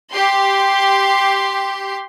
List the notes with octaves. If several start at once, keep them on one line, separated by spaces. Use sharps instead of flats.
G4 C6